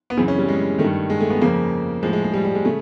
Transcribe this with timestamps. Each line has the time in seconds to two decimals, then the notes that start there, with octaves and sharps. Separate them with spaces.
0.10 B3
0.17 F#2 C#3 E3 C4
0.28 C#4
0.38 G3
0.49 G#3
0.79 D#3 A3
0.84 G2
1.10 G#3
1.21 A3
1.30 B3
1.41 F2 C#3 F3 A#3
2.03 A2 F3 G#3
2.13 G#3
2.24 G#3
2.33 G3
2.45 G3
2.55 G#3
2.65 C#3 A3